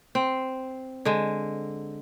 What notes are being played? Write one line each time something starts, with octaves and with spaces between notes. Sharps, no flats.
C4
D3 G#3